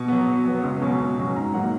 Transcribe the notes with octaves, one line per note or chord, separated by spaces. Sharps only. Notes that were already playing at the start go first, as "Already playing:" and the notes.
Already playing: B2 C#6
F#3 B3
B2
F#3 B3
C#2
B2 F#3 C#4
C#2
B2 F#3 C#4
G#2 A#5
F#3 A#3 D#4 F#5